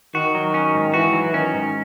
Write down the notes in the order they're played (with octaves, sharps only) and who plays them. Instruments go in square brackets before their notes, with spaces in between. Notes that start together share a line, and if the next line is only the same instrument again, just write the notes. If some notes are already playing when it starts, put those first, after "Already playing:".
[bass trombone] D#3 [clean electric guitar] F#4
[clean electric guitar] F#3
C#4
G#2
[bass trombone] E3 [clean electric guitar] F#4
[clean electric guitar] F#3
[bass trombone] D#3 [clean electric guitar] C#4
[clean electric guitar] G#2